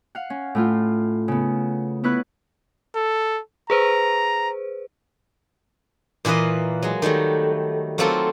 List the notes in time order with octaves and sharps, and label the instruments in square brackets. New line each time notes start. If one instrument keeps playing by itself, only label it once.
[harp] F5 F#5
C#4
A2 A3 F4
C#3 B3
B3 E4 B4 C#5 F#6
[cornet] A4
[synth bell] G#4 B4 C5 [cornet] A#5
[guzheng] A#2 E3 A#3 B4 D#5
F#3 G#3
D#3 F#3 G3 A3
F#3 A3 A#3 C4 F4 A4